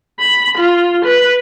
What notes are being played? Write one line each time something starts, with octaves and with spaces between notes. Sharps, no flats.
B5
F4
B4